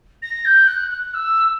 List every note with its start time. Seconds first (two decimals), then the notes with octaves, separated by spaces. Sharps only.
0.22 A#6
0.45 G6
0.67 F#6
0.91 F#6
1.14 E6